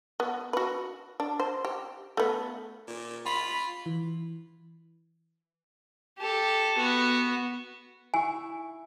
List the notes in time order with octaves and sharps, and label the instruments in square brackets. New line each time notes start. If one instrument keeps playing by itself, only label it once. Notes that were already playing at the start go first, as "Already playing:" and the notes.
[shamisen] B3
F#4 B4
D4
C5
G4
A3 B3
[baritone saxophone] A#2
[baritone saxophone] F4 [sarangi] B5
[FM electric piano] E3
[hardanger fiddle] G4 A4
B3 F#4
[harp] E4 C#6 [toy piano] G#5